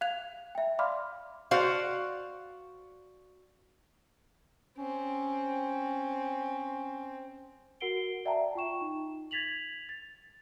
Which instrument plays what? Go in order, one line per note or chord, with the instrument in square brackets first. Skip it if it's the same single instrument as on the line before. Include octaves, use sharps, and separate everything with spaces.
[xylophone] F5 F#6 G#6 F7
E5 G5
D5 F5 B5 C6 D6 F6
[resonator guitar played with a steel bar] F#4 C5 D5 F5
[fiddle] C4 [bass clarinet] C#4
[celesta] F#4 A#4 F#5 C7 D7 G7
D5 E5 F#5 G5 A5 A#5
F4 G5 C#6 E7
D#4
G#6 A6 B6 F7 F#7
A6